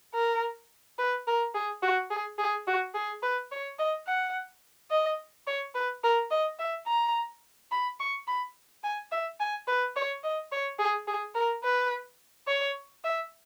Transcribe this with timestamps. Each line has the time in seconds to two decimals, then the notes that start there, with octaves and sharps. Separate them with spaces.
0.14 A#4
0.99 B4
1.27 A#4
1.54 G#4
1.82 F#4
2.10 G#4
2.39 G#4
2.67 F#4
2.94 G#4
3.23 B4
3.51 C#5
3.79 D#5
4.07 F#5
4.91 D#5
5.47 C#5
5.74 B4
6.04 A#4
6.31 D#5
6.59 E5
6.87 A#5
7.71 B5
8.00 C#6
8.27 B5
8.84 G#5
9.12 E5
9.40 G#5
9.67 B4
9.96 C#5
10.24 D#5
10.52 C#5
10.79 G#4
11.07 G#4
11.35 A#4
11.64 B4
12.47 C#5
13.04 E5